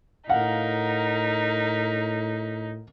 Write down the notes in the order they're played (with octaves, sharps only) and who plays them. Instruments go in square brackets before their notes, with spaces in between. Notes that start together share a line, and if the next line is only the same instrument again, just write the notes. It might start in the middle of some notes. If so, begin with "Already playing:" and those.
[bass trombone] A2 [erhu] D#4 [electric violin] A#4 B6 [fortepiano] F5 F#5